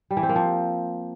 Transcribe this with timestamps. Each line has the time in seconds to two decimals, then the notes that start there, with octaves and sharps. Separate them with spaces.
0.11 G3
0.17 E3
0.23 C4
0.29 A#3
0.36 F3